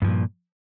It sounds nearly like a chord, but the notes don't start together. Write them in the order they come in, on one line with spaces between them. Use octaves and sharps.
G2 F3 A#2